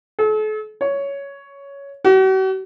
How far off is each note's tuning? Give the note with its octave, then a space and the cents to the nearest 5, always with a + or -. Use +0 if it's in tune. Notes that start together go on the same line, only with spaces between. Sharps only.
A4 -40
C#5 +10
F#4 +45